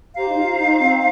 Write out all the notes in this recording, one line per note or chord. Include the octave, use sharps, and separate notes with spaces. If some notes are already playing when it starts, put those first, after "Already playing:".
G4 C5 F5 A#5
D#4
F4
D#4
C4